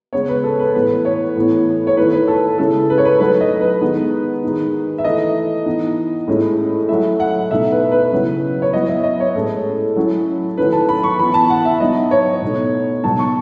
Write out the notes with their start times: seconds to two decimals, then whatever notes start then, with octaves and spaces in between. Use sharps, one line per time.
0.13 C#3 G#3 B3 C#5
0.29 B4
0.44 A4
0.59 B4
0.74 A2 E3 B3 B4
1.05 C#5
1.35 A2 E3 B3 E4
1.87 C#5
1.97 D#3 A3 E4 B4
2.13 B4
2.28 A4
2.58 C#3 G#3 C#4 E4 A4
2.90 B4
2.98 C#5
3.05 B4
3.20 F#3 A3 D#4 B4
3.41 D#5
3.61 B4
3.81 D#3 G#3 B3 D#4
4.44 D#3 G#3 D#4
4.98 E5
5.04 E3 A3 D#4 D#5
5.66 E3 B3 D#4
6.27 A2 G#3 C#4 E4
6.89 F#3 A3 E4 E5
7.20 F#5
7.51 B2 A3 D#4 E5
7.72 B4
7.92 B4
8.12 C#3 F#3 C#4 E4
8.62 C#5
8.73 F#3 B3 E4 D#5
8.89 E5
9.04 D#5
9.20 C#5
9.35 A2 G#3 C#4 A4
9.96 F#3 C#4 E4
10.58 D#3 F#3 A3 C#4 E4 B4
10.73 A5
10.89 B5
11.03 C#6
11.19 E3 B3 E4 B5
11.34 A5
11.50 F#5
11.65 E5
11.80 F#3 B3 D#4 D#5
12.11 C#5
12.42 B2 A3 D#4
13.03 B2 F#3 B3 D#4 A5
13.19 C#6